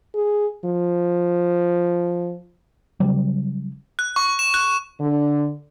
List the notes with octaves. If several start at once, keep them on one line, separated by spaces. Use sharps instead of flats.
G#4
F3
C#3 F#3 G3
F#6
C#6
E7
F#6
D3